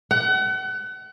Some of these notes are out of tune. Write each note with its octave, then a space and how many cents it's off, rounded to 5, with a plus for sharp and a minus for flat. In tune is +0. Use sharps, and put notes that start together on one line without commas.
F#5 +35